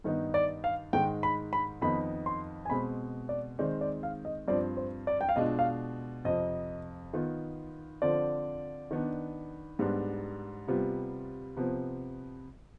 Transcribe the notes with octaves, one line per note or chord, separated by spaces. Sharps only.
G2 D#3 B3 D#4
D5
F5
G#2 D#3 G#3 G5
B5
B5
F2 D#3 B3 D#4 B5
C6
G#5
B2 G#3 C4 B5
D5
D#3 G#3 C4 D5
D5
F5
D#5
G2 F3 C4 D5
C5
D5
G5
F5
B2 G#3 D4 F4 D#5
F5
F2 C3 F3 D#5
D#3 B3 F4
D3 F3 C4 F4 D5
D#3 B3 D4
G#2 G3 B3 D4
C3 G3 B3 F4
C3 F3 B3